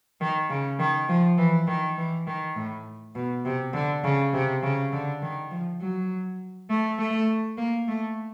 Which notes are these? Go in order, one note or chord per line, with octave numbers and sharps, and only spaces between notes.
D#3
C#3
D#3
F3
E3
D#3
E3
D#3
A2
B2
C3
D3
C#3
C3
C#3
D3
D#3
F3
F#3
A3
A3
A#3
A3